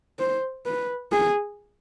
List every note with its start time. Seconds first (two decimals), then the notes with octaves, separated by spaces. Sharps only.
0.19 C5
0.66 B4
1.12 G#4